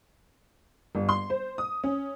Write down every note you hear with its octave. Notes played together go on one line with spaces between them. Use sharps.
G1
C6
C5
D#6
C#4